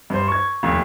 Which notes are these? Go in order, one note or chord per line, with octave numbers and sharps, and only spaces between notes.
G2 C5
C#6 G#6
F1 D#2